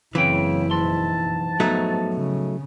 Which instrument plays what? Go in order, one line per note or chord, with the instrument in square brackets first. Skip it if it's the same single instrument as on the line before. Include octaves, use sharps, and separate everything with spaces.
[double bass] F#1 E4 [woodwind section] C#3 [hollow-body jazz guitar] E3 [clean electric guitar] F#3 C4 G5
[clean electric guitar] B1 F2 C6 [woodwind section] G#2 A5
[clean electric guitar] A2 F3 [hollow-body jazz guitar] F#3 A3 D#4 [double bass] B3
[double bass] C#3